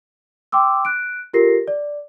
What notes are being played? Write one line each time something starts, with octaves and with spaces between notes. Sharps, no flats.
G5 C6 D6 E6
F#6 D7
F4 G4 A4 A#4 A#6 C7
D5